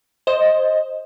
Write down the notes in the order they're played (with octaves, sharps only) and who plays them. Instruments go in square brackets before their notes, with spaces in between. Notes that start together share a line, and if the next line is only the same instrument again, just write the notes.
[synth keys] C5 D#5